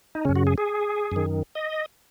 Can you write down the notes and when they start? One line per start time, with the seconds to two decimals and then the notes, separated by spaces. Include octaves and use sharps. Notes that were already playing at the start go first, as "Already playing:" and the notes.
0.15 D#4
0.25 F#2 C#3 C#4
0.36 F#4
0.47 G#4
0.58 G#4
1.12 F#2 D#3
1.55 D#5